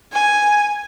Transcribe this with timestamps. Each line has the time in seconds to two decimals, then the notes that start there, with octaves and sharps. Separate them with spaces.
0.13 G#5